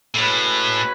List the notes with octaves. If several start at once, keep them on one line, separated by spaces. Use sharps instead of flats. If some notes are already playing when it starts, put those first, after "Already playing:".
A2 G#3 C#4 F#4 B4